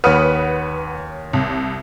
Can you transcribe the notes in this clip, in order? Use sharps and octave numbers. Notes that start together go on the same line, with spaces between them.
D#2 B4 C#5 F#5 D#6 F6
C2